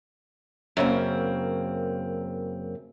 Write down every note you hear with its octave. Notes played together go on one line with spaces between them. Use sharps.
F#2 C#3 A#3 C4